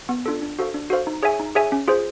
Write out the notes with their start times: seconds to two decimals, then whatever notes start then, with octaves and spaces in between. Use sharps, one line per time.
0.09 B3
0.26 D4 F4 A4
0.42 D4
0.59 F#4 A4 C5 F5
0.74 D4
0.90 F#4 A4 C5 F5
1.07 D#4
1.23 G#4 C#5 E5 G#5
1.40 D#4
1.55 G#4 C#5 E5 G#5
1.72 C#4
1.88 F4 G#4 C5